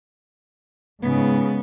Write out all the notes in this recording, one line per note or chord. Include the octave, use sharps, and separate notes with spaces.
G#2 C#3 B3